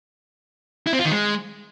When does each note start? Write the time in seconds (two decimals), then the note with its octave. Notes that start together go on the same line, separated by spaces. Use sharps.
0.87 E4
0.93 C4
0.99 F4
1.05 D#3
1.11 G#3